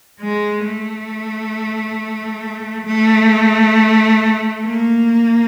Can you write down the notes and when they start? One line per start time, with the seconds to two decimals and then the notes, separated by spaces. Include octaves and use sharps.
0.21 G#3
0.65 A3
2.86 A3
4.65 A#3